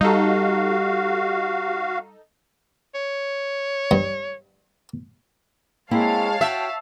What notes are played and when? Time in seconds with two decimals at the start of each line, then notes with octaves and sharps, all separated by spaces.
0.01 G3 D#4 F#4 G4 A4 F5
2.95 C#5
3.91 G2
5.91 G#3 A#3 C4 E4 C#5 F5 A5
6.41 F#4 E5 G5